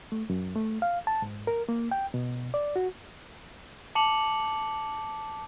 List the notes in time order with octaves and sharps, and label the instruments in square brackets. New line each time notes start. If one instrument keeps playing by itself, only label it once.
[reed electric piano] A3
F#2
A3
F5
A5
G#2
A#4
A#3
G5
B2
D5
F#4
[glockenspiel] A5 D6 C#7 F7 F#7